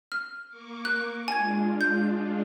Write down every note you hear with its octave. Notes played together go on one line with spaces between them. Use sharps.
F6
A#3 C#6 D6
F#6
G#3 D4 F4 G#5 G#6
G6